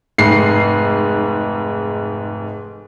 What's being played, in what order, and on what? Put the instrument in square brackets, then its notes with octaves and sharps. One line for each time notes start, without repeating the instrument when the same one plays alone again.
[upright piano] F1 G#2 C7